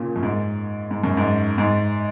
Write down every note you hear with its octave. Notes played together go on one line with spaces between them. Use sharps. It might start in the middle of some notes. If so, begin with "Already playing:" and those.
Already playing: A#2 C#3
F#2
G#2
G#2
F#2
G#2
G#2